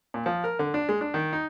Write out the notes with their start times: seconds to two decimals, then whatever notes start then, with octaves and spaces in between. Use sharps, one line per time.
0.14 A#2
0.26 F3
0.44 A#4
0.59 D3
0.74 D4
0.89 G#3
1.01 D4
1.14 D#3
1.33 D#4